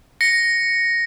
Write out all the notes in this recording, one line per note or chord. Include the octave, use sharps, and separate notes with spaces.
A#6 C#7